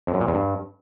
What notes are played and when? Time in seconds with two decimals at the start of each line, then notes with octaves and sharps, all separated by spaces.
0.07 F2
0.14 F#2
0.21 A#2
0.27 E2
0.34 G2